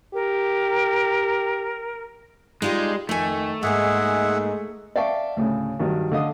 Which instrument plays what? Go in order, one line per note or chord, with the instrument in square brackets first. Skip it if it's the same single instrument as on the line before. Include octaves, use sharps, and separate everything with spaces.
[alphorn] G4 [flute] A#4
[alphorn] G3 [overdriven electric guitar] G#3 [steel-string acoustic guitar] D#4 F4 G4
[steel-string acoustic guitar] F2 G#5 [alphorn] D#3 [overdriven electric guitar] A3
[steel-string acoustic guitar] G#2 A#3 D#4 [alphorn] G#3 [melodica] G#4 E5 F#5
[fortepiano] D5 E5 F5 G5 A5 C#6
D2 A2 C#3
G2 D#3 F#3
D3 A3 D#5 F5 D#6